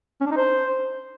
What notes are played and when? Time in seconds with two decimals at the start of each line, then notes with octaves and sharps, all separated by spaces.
0.21 C#4
0.26 D4
0.31 D#4
0.37 C5